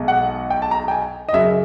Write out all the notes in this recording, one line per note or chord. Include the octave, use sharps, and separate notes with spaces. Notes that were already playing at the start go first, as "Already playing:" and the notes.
Already playing: B1 B2 G#3
F#5
G5
A5
A#5
G5
G#5
D#5
F#2 C#3 F#3 E5